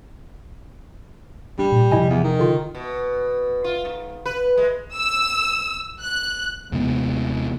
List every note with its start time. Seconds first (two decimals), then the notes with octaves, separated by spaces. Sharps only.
1.59 G3 D4
1.72 A#2
1.91 C3 F3 E4 D#5 G#5
2.10 E2
2.24 D#3
2.39 D3 F4 G5
2.75 B2
3.64 F4
3.85 G#2
4.26 B4
4.57 G#3
4.94 E6
6.02 F#6
6.72 D#2 C3 G#3 B3